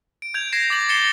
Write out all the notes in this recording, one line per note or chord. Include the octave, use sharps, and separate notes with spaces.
D7
G6 G#6 F7
G#6 A#6 C7 E7
D6 A6 F#7
A6 C7 C#7 E7 G7